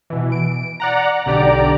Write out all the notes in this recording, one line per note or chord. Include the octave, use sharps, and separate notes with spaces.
B2 E3
D7
D5 F#5 A#5
B1 D3 G4 D5 A#5 D7